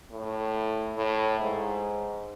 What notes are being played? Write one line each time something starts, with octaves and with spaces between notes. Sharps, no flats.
A2
A2
G#2